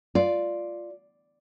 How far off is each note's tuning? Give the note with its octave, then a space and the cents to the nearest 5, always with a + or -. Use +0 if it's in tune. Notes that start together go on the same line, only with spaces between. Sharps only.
F4 +0 D5 +0